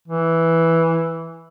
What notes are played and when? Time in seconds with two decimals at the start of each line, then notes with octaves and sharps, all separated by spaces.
0.08 E3